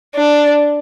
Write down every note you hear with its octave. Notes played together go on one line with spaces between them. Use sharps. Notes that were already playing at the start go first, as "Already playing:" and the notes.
D4